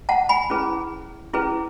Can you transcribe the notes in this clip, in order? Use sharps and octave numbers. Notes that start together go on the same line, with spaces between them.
F#5 A5
G#5 B5
C#4 E4 G#4 B4
C#4 E4 G#4 B4